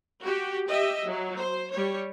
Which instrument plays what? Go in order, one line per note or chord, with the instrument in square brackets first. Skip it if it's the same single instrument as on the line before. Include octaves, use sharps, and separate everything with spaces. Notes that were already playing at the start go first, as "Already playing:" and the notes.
[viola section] F#4 G4
G4 D#5 E5
F#3
C5
G3 C#5